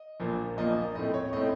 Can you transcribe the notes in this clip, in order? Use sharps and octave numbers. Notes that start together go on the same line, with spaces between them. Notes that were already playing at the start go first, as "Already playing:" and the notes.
Already playing: D#5
A#1 A#2 F3 A#3
A#1 A#2 F3 A#3 D#5
A2 A3 C4 D#5
C#5
A2 A3 C4 D#5